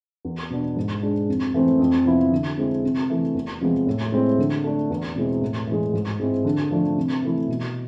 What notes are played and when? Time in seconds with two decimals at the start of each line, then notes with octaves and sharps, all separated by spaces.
0.25 E2
0.50 B2 B3 D4
0.77 G#2
1.03 G#3 D4
1.29 F2
1.54 E3 A3 C4
1.79 F2
2.06 C3 F3 B3 E4
2.31 D3
2.58 G#3 C4 E4
2.84 C3
3.10 E3 A3 E4
3.34 E2
3.61 C3 F3 G#3 B3
3.87 A2
4.12 G#3 C4 E4
4.38 D3
4.64 A3 D4
4.90 E2
5.16 B2 G#3 C4 E4
5.42 A2
5.67 E3 G#3
5.94 G#2
6.20 G#3 C4 E4
6.45 D3
6.71 F3 A3 D4
6.97 C3
7.22 E3 A3 E4
7.48 B2